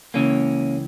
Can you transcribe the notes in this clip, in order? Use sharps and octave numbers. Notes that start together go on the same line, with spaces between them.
C#2 C#3 E3 A#3 C#4